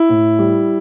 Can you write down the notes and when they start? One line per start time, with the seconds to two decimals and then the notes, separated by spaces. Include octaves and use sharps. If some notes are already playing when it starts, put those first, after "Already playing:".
Already playing: E4
0.09 A2
0.39 G3